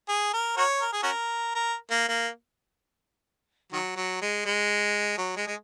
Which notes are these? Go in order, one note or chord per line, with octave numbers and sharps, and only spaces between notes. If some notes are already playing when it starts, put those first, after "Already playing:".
G#4
A#4
F#4 A#4 C#5
A#4
G#4
C#4 F#4 A#4
A#4
A#3
A#3
D#3 F#3
F#3
G#3
G#3
F#3
G#3
G#3